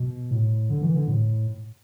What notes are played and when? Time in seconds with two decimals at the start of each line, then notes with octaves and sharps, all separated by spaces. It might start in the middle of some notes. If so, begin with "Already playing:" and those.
Already playing: B2
0.31 A2
0.69 D3
0.82 E3
0.94 D3
1.07 A2